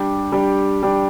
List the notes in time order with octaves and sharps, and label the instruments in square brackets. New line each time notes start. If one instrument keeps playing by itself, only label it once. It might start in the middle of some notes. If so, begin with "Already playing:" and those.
Already playing: [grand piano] G3 D4 G4
G3 D4 G4
G3 D4 G4